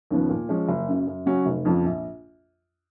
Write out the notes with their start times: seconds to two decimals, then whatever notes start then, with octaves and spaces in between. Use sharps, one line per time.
0.11 D#2 C#3 F3 B3
0.29 A#2
0.49 F3 G#3 C#4
0.68 F#1
0.88 F#2 C#3
1.07 F#2
1.26 C#3 F#3 C#4 F#4
1.46 F1
1.65 F2 C#3 F3
1.85 A#1